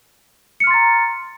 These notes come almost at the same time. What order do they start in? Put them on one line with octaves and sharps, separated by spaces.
C#7 F6 C6 A6 A#5